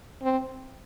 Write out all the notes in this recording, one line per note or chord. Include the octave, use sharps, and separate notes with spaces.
C4